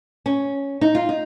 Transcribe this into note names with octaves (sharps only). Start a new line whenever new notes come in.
C#4
D#4
F4
D#4